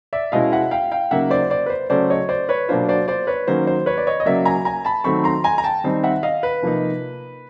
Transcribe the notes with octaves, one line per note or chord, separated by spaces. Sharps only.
D5 E5
B2 G#3 C#4 E4 D#5 F5
E5 F#5
F5 G5
F5 G5
C#3 F#3 A#3 D#4 E5 F#5
C5 D5
C5 D5
B4
C5
C#3 F#3 A3 C#4 C5 D5
C#5 D#5
C5 D5
B4 C#5
B2 F#3 A#3 D4 F4 C5
C5 D5
C5 D5
B4 C#5
D#3 F#3 A#3 C#4 C5
C5
B4 C#5
D5
C#5 D#5
D#5
C#3 F#3 A#3 D5 E5
G#5 A#5
G#5 A#5
A5 B5
D#3 F#3 A3 C4 B5 C#6
A#5 C6
G#5 A#5
A#5
G5 A5
D#3 G3 C4 D#4
E5 F#5
D#5 F5
B4
C3 F3 A#3 D#4